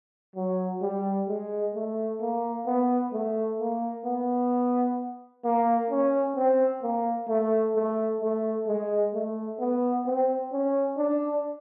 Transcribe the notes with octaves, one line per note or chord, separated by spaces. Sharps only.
F#3
G3
G#3
A3
A#3
B3
A3
A#3
B3
A#3
C#4
C4
A#3
A3
A3
A3
G#3
A3
B3
C4
C#4
D4